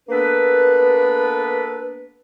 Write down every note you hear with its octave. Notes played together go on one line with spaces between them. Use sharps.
A#3 B3 D4 A4 B4